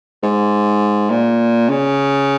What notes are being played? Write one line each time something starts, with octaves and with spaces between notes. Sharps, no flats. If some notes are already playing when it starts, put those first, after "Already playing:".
G#2
A#2
C#3